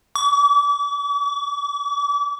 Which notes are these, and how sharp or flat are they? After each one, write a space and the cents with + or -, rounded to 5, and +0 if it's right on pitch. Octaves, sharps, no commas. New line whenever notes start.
D6 -45